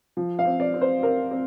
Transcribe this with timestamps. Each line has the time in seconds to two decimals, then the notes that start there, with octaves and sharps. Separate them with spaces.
0.17 F3
0.39 F5
0.45 C4
0.60 D5
0.74 C4
0.81 C5
1.03 C4 A#4
1.31 C4